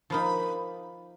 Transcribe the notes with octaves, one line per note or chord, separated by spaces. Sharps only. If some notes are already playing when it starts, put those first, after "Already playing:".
F3 A#3 D#4 B5